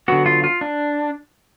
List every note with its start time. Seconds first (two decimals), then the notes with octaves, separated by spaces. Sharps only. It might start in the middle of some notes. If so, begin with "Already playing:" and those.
0.08 D3 F#3 B3 F#4
0.26 F4
0.44 F4
0.61 D4